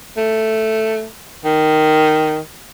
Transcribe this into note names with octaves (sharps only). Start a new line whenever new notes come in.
A3
D#3